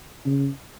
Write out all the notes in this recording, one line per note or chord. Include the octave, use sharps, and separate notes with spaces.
C#3